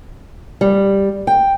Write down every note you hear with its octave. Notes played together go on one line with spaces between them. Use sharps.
G3
G5